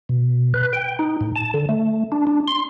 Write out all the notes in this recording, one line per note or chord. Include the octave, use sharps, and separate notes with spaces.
B2
B4
G5
D#4
A2
A5
D3
A3
D4
D4
C6